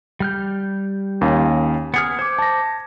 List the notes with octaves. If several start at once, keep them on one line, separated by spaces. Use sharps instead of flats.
G3 F6 G6
D#2 C#4 F5
B3 G#4 F6 C#7
C5 D6 G#6
A5 A#6